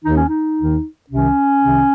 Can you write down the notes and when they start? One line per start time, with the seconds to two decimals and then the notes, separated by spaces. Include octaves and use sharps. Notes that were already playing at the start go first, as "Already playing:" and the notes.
0.03 D#2 D#3 D#4
0.16 C#4
0.28 D#4
0.57 D#2 D#3
1.10 C2 C3 D#3 C#4
1.63 C2 C3 D#3